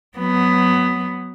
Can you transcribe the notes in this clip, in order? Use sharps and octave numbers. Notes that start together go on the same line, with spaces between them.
F#3 B3